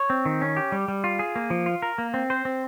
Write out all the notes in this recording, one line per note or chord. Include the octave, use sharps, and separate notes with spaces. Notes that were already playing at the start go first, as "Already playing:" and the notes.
Already playing: C#5
C4
D#3
C#4
G4
G3
G3
F4
G#4
A#3
F3
F4
A#4
A#3
C4
C5
C4